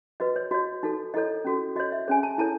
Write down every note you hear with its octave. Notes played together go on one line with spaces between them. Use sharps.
F#4 B4 D#5
C#5
F#4 C#5 D#5
D#4 F#4 A4
E4 A4 C#5 D#5
C#4 F#4 A4
F#4 C#5 D#5
E5
C#4 G#4 C#5 G#5
A5
E4 A4 C#5 A5